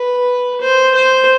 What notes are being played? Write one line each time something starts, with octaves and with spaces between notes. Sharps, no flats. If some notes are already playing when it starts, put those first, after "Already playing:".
Already playing: B4
C5
C5